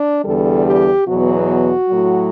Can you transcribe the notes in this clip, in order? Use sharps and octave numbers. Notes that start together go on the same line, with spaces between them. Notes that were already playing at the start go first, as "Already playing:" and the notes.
Already playing: D4
E2 D3 G3 A4
G4
E2 B2 F#3 F#4
A2 F#3